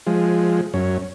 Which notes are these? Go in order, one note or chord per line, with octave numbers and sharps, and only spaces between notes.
F3 G#3
F#2 C#4